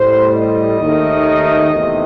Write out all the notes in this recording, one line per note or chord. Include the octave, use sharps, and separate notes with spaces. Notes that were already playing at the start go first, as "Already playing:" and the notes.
Already playing: A2 G3 C5
D#5
D#2 D#3 A3
E2 C3 D#3 A3